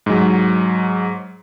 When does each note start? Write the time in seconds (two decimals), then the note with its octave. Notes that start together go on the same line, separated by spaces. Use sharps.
0.06 G#2 F#3